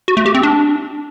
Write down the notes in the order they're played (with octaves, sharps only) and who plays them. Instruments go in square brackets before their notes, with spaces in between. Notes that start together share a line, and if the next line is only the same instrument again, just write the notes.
[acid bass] F#4
A3
G4
C4
D4